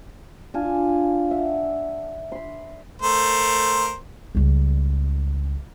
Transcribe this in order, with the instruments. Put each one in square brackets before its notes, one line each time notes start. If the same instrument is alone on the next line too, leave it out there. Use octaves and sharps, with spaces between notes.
[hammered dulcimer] D4 F4 G#5 A5
E5 F#5
B5 C6
[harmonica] A3 A#4 C5
[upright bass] C#2 G3